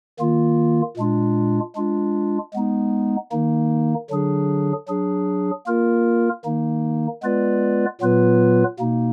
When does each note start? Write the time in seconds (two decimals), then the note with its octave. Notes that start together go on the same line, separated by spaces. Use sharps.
0.19 D#3 A#3 F4
0.97 A#2 G#3 D4 F4
1.76 G#3 D4 F4
2.54 G#3 B3 D#4
3.32 D#3 A#3 D#4
4.10 D3 F#3 D4 G#4
4.88 F#3 D4 G#4
5.67 A#3 F4 A#4
6.45 D#3 A#3 D#4
7.23 G#3 B3 F4 B4 D5
8.01 A#2 F#3 B3 F4 B4
8.79 B2 A#3 D#4